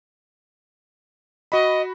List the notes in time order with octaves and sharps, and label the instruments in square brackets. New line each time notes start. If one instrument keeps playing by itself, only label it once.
[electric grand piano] F#4 B5 [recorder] D#5